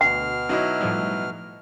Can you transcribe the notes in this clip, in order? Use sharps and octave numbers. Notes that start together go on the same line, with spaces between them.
D2 B2 F#5 F6
F#3 D#4 E4
A2 F3 G3